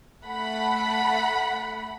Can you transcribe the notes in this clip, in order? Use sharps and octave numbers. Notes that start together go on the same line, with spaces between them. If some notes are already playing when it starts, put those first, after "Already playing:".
A3 F#5 B5